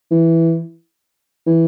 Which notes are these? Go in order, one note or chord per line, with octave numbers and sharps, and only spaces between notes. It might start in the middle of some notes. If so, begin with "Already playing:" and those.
E3
E3